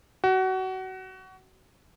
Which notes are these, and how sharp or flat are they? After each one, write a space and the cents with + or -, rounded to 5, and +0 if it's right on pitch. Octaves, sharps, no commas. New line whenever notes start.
F#4 +25